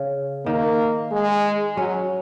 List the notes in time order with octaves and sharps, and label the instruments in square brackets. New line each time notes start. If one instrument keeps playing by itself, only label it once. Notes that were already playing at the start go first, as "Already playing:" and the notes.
Already playing: [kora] C#3
[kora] D#3 [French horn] A#3
[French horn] G#3
[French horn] F#3 [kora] C#4